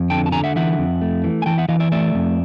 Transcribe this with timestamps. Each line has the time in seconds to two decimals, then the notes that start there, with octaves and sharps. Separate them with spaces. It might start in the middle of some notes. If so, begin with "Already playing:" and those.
Already playing: F2
0.10 D3 G5 A5
0.26 A5
0.32 D3 G#5 A#5
0.44 E5 F#5
0.56 E3 E5 F#5
0.79 F2
1.02 A3
1.24 E3
1.42 G#5
1.46 E3 G5 A5
1.58 E5 F#5
1.69 E3 D#5 F5
1.80 D5 E5
1.92 A3 D5 E5
2.15 F2